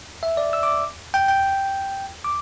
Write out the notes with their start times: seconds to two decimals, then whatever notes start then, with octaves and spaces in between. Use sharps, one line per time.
0.23 E5
0.37 D5
0.53 E6
0.63 D6
1.14 G5
1.28 G5
2.24 D6